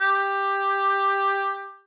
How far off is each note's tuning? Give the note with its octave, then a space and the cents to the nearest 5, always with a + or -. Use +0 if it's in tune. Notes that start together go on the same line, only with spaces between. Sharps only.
G4 +10